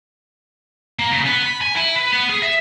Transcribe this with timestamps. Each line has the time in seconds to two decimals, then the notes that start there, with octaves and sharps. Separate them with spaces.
0.99 A#3
1.11 C#3
1.26 B3
1.43 B5
1.62 G#5
1.76 E4
1.96 B4
2.12 B3
2.30 G#4
2.43 E5